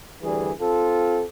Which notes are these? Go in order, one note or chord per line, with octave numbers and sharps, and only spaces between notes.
D2 E3 G3 G#4
C4 F4 A4